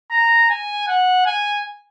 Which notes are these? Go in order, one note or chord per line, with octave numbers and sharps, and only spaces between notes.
A#5
G#5
F#5
G#5